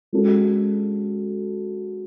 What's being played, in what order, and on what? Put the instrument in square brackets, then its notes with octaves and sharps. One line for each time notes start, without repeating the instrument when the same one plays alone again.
[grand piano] G#3 C#4 F#4 A4